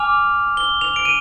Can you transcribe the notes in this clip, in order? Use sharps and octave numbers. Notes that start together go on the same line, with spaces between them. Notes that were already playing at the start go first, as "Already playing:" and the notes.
Already playing: G#5 D6 F6 F7
G7
F7
D7
D#7